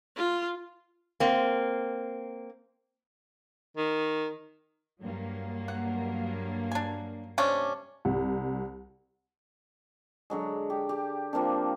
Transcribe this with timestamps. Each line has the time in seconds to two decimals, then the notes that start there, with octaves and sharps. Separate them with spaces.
0.17 F4
1.20 A#3 C4
3.77 D#3
5.01 G2 F#3 A#3
5.68 F#5
6.72 D4 G#5
7.38 C3 C#4 D4
8.05 C2
10.30 D3 F#3 G#3
10.70 G4
10.89 G4
11.33 F3 A#3 C4 D4